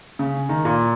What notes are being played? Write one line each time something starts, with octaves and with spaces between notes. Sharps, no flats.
C#3
D#3
A#2